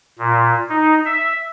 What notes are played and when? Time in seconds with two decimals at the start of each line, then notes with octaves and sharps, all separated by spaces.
0.18 A#2
0.69 D#4
1.05 E5